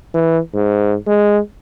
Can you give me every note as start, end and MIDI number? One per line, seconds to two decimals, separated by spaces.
0.14 0.39 52
0.54 0.95 44
1.06 1.39 56